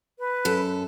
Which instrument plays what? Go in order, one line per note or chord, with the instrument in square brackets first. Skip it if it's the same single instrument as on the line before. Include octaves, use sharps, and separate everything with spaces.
[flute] B4
[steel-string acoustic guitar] F#2 A4